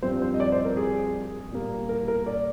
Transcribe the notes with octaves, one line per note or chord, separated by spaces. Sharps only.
G2 F3 C4 C5
C5
D#5
D5
C5
A#4
G#4
A#2 G3 A#3
A#4
A#4
D5